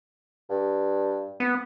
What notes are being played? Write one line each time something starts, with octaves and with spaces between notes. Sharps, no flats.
G2
B3